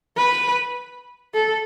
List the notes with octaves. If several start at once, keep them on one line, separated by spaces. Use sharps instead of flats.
B4
A4